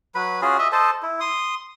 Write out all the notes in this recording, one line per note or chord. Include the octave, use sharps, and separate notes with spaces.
F#3 B4 B5
C#4 F4 F#4 G#4
D#5 E5
A4 C5 D#5 A5
E4
C6 D#6